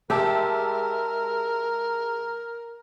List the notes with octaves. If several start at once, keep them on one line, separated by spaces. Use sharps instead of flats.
G#3 G4 A#4 E5 A5